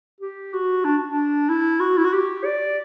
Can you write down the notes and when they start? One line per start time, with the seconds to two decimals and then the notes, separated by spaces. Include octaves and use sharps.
0.20 G4
0.53 F#4
0.84 D4
1.06 D4
1.49 E4
1.80 F#4
1.97 E4
2.05 F#4
2.13 G4
2.45 D5